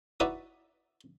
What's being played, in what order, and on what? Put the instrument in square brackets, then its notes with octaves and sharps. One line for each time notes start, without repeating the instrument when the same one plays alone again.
[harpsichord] D#4 E4 F#4 B4 D5 E5